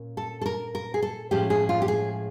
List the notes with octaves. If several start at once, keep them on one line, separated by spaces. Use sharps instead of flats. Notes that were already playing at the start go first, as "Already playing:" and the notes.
Already playing: A#2 C#4
A4
A4
A#4
A#4
G#4
A4
A2 F3 G#3 C#4 G4
G#4
F4
G4
G#4